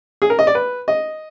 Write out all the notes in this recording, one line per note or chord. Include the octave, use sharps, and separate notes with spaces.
G#4
A#4
D#5
D5
B4
D#5